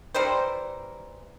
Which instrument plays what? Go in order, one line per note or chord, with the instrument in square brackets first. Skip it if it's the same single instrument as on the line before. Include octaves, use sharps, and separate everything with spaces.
[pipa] E3 G3 A#4 C5